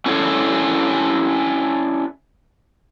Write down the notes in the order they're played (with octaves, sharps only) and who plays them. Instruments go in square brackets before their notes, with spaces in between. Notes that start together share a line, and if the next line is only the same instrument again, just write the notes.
[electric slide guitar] C#4 D4 E4 G#4 A4 C#5